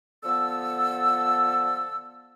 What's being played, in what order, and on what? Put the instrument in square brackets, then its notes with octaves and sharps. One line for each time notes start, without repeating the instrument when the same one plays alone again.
[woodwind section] D3 F3 B3 A4 E6